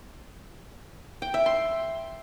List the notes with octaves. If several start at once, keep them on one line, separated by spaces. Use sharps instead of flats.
G5
E5
C6